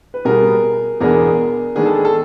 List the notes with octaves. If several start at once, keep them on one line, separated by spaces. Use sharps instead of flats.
B4
B2 G3 B3 G#4 A#4
E2 B2 G#3 B3 D4 G#4 A#4
D#3 G#3 B3 D4 G#4
A4
G#4
A4